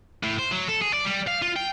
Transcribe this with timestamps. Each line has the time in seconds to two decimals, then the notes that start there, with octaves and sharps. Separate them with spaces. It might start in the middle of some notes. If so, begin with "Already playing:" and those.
0.23 A2
0.39 C5
0.51 F#3
0.68 A4
0.82 G#4
0.93 D5
1.05 G3
1.27 F5
1.42 F4
1.56 G5